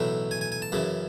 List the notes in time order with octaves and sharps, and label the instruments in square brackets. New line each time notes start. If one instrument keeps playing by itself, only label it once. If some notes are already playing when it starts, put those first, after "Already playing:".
Already playing: [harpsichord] B1 A2 E3 A3
G#5
G#5
G#5
A5
F#2 C#3 E3